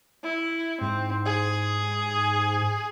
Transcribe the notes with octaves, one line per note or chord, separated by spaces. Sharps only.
E4
G#2 C4
G#4